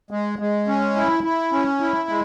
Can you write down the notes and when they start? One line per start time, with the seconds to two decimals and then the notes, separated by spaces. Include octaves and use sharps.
0.11 G#3
0.39 G#3
0.67 C#4
0.96 E4
1.24 E4
1.52 C#4
1.80 E4
2.09 G#3